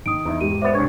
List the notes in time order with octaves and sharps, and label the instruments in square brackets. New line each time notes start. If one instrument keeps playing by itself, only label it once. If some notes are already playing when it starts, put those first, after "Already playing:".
[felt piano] D#3 [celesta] D#6 D7
[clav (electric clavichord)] E2 [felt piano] D#4 E5
[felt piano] G#2 G4 [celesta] D#7
[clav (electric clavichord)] B3 D5 [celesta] C5 E5
[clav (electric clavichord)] C2 C#5 [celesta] D4